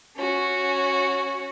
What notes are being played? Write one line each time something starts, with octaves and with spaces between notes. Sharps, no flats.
C#4 F#4